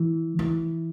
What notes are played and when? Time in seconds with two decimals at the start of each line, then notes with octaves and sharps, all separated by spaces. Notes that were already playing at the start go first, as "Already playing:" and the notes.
Already playing: E3
0.39 E3